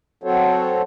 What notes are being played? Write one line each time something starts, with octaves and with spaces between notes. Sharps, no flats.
F#3 C4 F#4 A4 C5 C#5